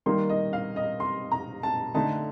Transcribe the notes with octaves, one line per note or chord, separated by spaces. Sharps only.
D#3 G3 A#3 D#4 C6
D#5
F5
D#5
C6
A#5
A5
D3 A3 D#4 A5